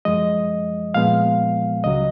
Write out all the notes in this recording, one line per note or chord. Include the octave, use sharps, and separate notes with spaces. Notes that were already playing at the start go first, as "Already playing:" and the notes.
F#2 F3 G#3 D#5
A#2 F3 G#3 B3 F5
C#2 C#3 F#3 D#5